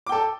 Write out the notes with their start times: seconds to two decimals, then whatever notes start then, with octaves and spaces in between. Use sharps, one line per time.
0.07 D6
0.09 G5
0.12 A4